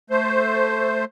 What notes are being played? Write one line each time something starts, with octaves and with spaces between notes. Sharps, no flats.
A3 C5